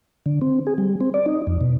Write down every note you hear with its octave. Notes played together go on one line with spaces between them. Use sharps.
D3
C4
G#4
G3
C4
D5
D#4
F2
B2